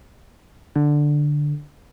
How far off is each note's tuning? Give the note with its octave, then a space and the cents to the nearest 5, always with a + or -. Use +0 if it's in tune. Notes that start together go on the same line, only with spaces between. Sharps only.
D3 +5